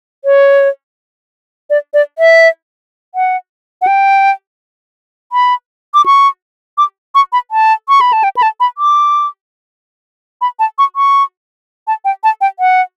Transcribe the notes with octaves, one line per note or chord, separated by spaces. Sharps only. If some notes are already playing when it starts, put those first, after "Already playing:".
C#5
D5
D5
E5
F#5
F#5
G5
B5
D6
C#6
D6
C#6
B5
A5
C#6
B5
A5
G5
B5
A5
B5
D6
B5
A5
C#6
C#6
A5
G5
A5
G5
F#5